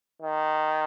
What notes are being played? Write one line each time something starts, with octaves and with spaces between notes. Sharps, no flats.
D#3